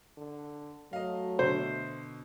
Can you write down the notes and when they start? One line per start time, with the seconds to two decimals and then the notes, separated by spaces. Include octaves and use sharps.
0.17 D3
0.93 F#3 A3 D#5 F5
1.39 B2 D3 C5